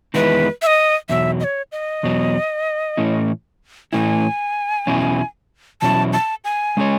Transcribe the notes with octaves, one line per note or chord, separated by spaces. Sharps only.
E2 D#3 G#3 B3 E4 B4
E5
D#5
E2 B2 F#3 E5
D#5
C#5
D#5
E2 B2 F#3
A2 E3 A3 C#4 E4
A2 E3 A3 C#4 E4 G#5
E2 B2 F#3 C#4 E4
E2 B2 F#3 C#4 E4 A5
A5
G#5
G#3 C#4 G#4 C#5